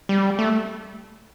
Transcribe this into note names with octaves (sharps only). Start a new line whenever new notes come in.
G3
A3